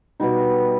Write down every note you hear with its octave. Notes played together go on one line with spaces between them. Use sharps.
B2 G3 D#4